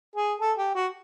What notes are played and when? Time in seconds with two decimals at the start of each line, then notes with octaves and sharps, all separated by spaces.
0.16 G#4
0.40 A4
0.58 G4
0.75 F#4